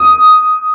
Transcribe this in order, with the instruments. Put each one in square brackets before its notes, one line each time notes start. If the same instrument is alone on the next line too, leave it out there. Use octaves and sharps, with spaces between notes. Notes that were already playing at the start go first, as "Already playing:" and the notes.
Already playing: [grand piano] D#6